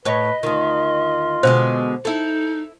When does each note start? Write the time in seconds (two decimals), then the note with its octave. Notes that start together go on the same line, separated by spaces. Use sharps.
0.05 A2 B4 C#5 D#5
0.43 D2 D#3 F4
1.43 B2 D3 G#3 C5
2.05 D#4 E4 A4